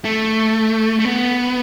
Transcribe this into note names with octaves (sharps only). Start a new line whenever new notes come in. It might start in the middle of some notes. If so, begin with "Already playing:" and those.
A3
A3
B3